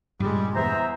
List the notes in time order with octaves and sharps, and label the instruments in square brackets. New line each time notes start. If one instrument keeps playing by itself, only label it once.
[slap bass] G2 A#2 C#3 [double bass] G3 G#3
[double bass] E2 [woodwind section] C5 E5 A#5